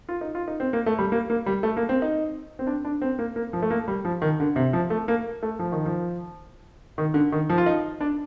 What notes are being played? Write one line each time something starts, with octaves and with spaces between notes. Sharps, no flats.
F4
D#4
F4
D#4
C4
A#3
A3
G3
A#3
A#3
G3
A3
A#3
C4
D#4
C4
D4
D4
C4
A#3
A#3
F3
A3
A#3
G3
F3
D#3
D3
C3
F3
A3
A#3
A3
F3
D#3
F3
D#3
D3
D#3
F3
F4
D#4
D4